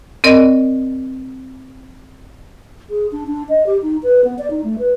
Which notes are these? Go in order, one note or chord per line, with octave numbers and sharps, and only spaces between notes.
C4 A#4 D5 D#5
G#4
D4
D4
D#5
G4
D#4
B4
B3
D5
D#4
A3
B4